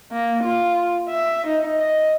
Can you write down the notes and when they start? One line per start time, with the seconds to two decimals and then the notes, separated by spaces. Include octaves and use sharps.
0.12 A#3
0.44 F4
1.10 E5
1.47 D#4
1.79 D#5